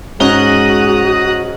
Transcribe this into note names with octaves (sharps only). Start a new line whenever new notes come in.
G#2 G#3 C#4 F#4 A#5 D#6 F#6 G7